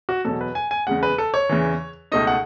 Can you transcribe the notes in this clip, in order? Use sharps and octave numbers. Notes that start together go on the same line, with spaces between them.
F#4
E2 B2 F#3 A4
B4
G#5
G#5
E2 C#3 G#3 F#5
B4
A4
C#5
E2 C#3 E3
C#2 B2 A3 D#4 D#5
F#5